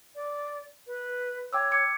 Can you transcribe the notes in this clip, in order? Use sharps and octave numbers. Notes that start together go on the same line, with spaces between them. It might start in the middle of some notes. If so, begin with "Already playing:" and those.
D5
B4
C#5 G5 D6 E6
D6 G#6 C#7